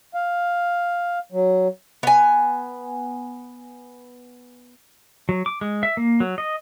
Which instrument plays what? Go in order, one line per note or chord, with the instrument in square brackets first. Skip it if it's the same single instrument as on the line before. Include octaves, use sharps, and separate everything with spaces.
[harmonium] F5
F#3
[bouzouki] B3 G#5
[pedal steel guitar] F#3
D6
G#3
E5
A#3
F#3
D#5